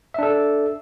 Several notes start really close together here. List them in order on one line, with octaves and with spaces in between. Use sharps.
E5 D4 A4